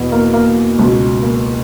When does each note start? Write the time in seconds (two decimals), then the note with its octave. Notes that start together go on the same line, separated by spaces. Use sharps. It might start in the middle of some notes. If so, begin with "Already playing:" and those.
Already playing: E2 B2 B3
0.12 A#3
0.33 A#3
0.79 C#2 B2
1.22 A#3